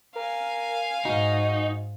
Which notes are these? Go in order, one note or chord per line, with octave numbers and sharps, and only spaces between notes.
A#4 F5 G#5
G#2 D#4 F#4